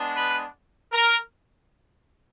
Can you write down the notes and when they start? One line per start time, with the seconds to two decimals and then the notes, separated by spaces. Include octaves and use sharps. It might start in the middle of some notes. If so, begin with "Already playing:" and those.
Already playing: G#3 B3 D4
0.14 B4
0.92 A#4